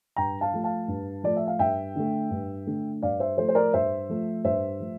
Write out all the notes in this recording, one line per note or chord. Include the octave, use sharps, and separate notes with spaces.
G2 G5 A#5
F5 A5
F3 A3
F5 A5
G2
F3 A3 D5
E5
F5
G2 E5 G5
D3 A3
G2
D3 A3
G2 D5 F5
C5 E5
F3 A3 A4 C5
C5
A#4 D5
G2 C5 E5
F3 A3
G2 C5 E5
F3 A3